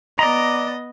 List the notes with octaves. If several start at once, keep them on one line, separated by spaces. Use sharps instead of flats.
B3 D5 D#5 A#5